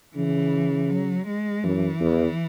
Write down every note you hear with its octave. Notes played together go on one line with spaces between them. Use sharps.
C#3 E3
F#3
G#3
F#2 E3
E2